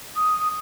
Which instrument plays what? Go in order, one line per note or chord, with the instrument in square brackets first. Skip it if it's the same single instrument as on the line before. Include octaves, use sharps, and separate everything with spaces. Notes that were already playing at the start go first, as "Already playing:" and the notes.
[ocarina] D#6